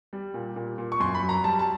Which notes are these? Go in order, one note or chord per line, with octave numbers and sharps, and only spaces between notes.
G3
A#2
A#2
A#2
C#6
F#2 C6
B5
F#3
A#5
G3 A5
A5